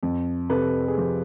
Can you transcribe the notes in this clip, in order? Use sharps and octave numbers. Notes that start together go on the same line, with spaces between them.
F2
C3 A4 B4
G#4
F3 G4